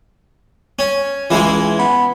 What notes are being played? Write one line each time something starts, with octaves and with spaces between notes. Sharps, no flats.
C#4
C#2 E3 G#3
B3